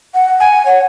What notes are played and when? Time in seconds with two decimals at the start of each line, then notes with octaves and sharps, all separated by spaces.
0.14 F#5
0.40 G#5
0.66 C#5